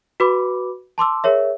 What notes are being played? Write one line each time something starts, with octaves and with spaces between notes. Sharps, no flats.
F#4 B4 B5 D6
A5 C6 D6 E6
G#4 A#4 C#5 E5